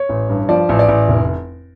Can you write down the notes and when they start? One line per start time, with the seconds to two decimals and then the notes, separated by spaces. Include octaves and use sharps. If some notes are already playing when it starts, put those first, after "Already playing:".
Already playing: C#5
0.09 A1
0.30 G2
0.49 F3 D5
0.69 A1
0.79 D5
0.88 A1
1.08 F1